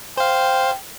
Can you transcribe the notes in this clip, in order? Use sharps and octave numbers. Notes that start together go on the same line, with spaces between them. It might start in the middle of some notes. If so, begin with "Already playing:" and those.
C5 F5 G5